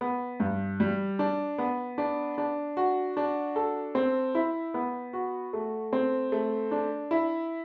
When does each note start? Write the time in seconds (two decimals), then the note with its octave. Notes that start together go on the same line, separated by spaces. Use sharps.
0.01 B3
0.40 G2
0.80 G3
1.19 D4
1.58 B3
1.98 D4
2.38 D4
2.77 F#4
3.17 D4
3.56 A4
3.95 C4
4.35 E4
4.74 B3
5.13 F#4
5.53 A3
5.93 C4
6.32 A3
6.71 D4
7.11 E4